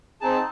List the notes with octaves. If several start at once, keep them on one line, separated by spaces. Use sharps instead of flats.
C4 D#4 G#4 A5